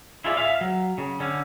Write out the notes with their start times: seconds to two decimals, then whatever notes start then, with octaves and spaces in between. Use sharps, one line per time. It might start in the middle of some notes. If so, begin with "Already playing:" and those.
0.24 E4 F4 G#4 D5
0.37 E5 F5
0.61 F#3
0.98 C#3
1.20 D3 C#4